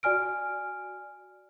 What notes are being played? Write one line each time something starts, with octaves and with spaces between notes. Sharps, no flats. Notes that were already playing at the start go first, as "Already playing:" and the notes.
F#4 D5 G#5 F6 D7